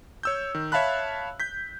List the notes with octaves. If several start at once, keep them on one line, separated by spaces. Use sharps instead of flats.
C#5 E6 G6
D#3
C#5 E5 F5 A5 B5 F#6
G6 B6